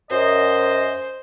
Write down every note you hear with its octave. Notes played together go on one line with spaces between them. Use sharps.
F#2 C5 D#5